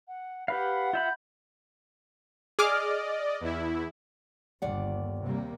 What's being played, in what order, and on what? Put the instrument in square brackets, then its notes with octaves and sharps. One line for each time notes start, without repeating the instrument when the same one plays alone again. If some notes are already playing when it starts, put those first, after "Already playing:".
[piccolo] F#5
[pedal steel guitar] G4 B4 F5 [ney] F#5 [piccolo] B5
[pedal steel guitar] F4 E5 B5 [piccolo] G6
[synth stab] G#4 D6 F6 [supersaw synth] D5 D#5
[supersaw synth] E2 E4
[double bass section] G1 [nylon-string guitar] D#2 D5 F#5
[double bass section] C3 G3 A#3